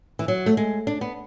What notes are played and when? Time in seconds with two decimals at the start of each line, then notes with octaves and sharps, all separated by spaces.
0.19 E3
0.28 F#3
0.46 A3
0.57 G#3
0.87 D4
1.01 B3